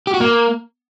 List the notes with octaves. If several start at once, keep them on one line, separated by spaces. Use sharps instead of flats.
G4
F#4
A#3